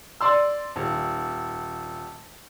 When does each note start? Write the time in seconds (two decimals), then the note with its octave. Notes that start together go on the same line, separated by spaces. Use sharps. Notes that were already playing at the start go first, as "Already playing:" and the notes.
0.21 D5 C6 E6
0.76 D#1